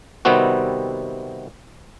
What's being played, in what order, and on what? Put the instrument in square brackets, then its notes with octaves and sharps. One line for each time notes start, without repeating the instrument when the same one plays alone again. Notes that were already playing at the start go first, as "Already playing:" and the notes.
[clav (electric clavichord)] C3 D#3 G3 B3 C4 F#4